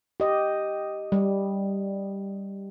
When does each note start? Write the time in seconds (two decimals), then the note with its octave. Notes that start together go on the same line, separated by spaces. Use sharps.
0.20 G4 D#5
1.12 G3